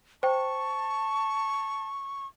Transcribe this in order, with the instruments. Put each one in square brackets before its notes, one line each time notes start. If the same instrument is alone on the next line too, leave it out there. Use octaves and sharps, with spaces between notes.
[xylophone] C5 G5 [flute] A5 [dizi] C#6